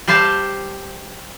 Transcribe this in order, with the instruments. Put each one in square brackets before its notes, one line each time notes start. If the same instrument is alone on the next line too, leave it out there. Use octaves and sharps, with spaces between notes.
[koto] G3 G4 C5 F5 A5